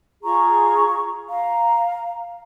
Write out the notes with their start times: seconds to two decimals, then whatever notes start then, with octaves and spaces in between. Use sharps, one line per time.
0.24 F4 G#4 A#5 C#6
1.28 F5 A#5